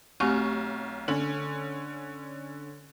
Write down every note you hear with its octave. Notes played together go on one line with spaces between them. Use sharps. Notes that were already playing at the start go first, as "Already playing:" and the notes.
B1 A3 C4 G4 C#6 F6
D3 C#4 A4